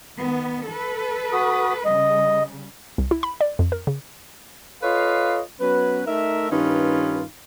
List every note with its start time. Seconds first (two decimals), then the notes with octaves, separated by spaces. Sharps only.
0.16 D#3 B3
0.66 A4 B4
1.33 F#4 D#6
1.85 C#3 G3 D#5
2.98 C2
3.11 E4
3.23 B5
3.41 D5
3.59 F2
3.72 A#4
3.87 C#3
4.83 F4 A4 B4 C#5 D#5 F5
5.60 F#3 B3 C#4 B4
6.07 A3 D#4 A#4 E5
6.50 G2 D#3 C#4 D#4 F4 B4